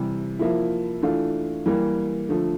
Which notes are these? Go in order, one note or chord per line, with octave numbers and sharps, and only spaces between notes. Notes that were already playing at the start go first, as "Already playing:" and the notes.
Already playing: C3 E3 G3
F3 A#3 E4
E3 A3 D4 F4
E3 G3 A#3
D3 F3 A3